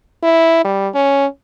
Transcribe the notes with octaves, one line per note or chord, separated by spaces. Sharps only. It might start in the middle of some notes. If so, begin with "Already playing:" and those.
E4
G3
C#4